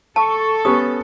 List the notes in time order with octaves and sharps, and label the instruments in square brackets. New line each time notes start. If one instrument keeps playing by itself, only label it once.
[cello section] A4 [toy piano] A5 [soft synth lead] C#6
[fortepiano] B3 C#4 [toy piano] G4 D#6